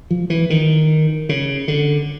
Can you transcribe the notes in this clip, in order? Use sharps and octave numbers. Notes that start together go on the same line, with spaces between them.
F3
E3
D#3
C#3
D3